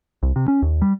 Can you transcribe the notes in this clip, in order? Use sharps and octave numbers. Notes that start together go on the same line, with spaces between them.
C2
C3
C#4
D#2
G3